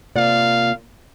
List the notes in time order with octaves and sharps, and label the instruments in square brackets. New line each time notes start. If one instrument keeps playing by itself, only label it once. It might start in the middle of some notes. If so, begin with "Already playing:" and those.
[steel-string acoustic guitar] C3 A#3 F4 D5 [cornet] F5